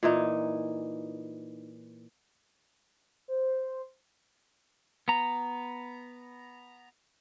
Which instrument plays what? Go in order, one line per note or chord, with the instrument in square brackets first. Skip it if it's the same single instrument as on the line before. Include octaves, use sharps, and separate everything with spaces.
[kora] A#2 E3 D#4
[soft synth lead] C5
[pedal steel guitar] B3 A#5